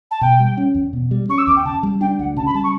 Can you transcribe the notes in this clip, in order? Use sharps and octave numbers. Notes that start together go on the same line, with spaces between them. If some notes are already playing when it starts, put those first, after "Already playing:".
A5
B2 G5
G3
C#4
E2
B2
G3
C#4 C#6
E6
E2 D6
G5
C#3 A5
G3
D4 G5
D2 F#5
C#3 A5
B5
G3 A5
C#6